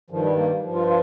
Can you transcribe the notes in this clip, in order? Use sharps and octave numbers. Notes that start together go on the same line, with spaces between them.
G2 D#3 F3
G3
A#3
G2 F3
F4
F4